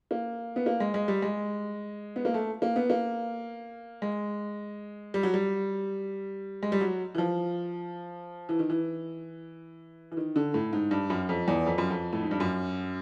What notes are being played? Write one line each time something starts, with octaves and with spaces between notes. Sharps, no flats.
A#3
B3
A#3
G#3
G#3
G3
G#3
B3
A#3
A3
A#3
B3
A#3
G#3
G3
F#3
G3
G#3
G3
F#3
E3
F3
E3
D#3
E3
E3
D#3
D3
A2
G#2
G2
F#2
F2
E2
F2
F#2
F2
A2
G#2
G2
F#2